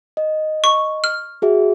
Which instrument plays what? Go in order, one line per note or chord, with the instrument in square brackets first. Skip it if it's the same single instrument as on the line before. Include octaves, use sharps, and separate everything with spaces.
[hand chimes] D#5
[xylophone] C#6
F6
[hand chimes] F#4 G#4 E5